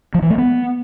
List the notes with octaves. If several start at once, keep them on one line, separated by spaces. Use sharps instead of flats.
F3
E3
A3
B3